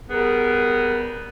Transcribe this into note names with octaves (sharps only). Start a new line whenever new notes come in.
G3 B3 G#4 A#4